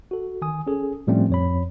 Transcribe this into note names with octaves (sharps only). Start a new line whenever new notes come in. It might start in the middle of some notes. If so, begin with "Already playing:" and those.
F#4 A4
D#3 G#5 D#6
C#4 G#4 A4
A2 F3 G3 A3 C4 C#4
F2 C#5 B5